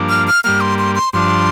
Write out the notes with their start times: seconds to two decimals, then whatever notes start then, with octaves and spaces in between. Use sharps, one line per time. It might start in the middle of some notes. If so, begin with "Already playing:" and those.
Already playing: G2 F3 A#3 D4
0.09 F6
0.28 F6
0.44 G2 G3 A#3 F6
0.61 C6
0.79 C6
0.95 C6
1.13 G2 F3 D4 C6